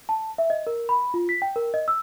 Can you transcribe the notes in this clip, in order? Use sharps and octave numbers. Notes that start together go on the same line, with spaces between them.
A5
E5
D#5
A#4
B5
F4
B6
G5
A#4
D#5
E6